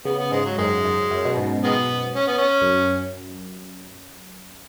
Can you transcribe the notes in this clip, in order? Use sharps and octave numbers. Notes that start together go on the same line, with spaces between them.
C#3 B3
B3
G#2 G#3
F#3
F#2 D#3 G#3
F#2
F#2
B2
G#2
D#3 G#3 B3
C#4
B3
C#4
F#2